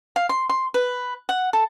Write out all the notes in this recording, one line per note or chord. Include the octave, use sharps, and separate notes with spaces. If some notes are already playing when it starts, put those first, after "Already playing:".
F5
C6
C6
B4
F#5
A4